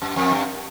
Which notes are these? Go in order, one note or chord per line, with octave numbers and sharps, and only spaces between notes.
F#2
F2
G2